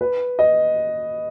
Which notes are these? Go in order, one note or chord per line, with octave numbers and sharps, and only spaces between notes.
B4
D#5